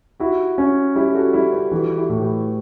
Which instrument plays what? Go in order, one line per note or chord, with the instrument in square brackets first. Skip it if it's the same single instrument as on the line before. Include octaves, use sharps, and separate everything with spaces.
[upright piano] E4 G4 [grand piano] F#4
[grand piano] C#4
[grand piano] G3 [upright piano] E4 G4
[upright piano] F#4 A4
[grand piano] G3 [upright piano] E4 G4
[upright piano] G4 B4
[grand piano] E3 [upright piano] F#4 A4
[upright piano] E4 G4
[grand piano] A2
[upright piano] G4 B4